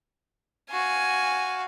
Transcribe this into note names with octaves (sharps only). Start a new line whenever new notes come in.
F#4 F5 G#5